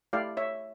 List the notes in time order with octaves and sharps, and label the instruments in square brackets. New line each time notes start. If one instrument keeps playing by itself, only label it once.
[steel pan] A3 E4 G4 D5 F5
C#5 E5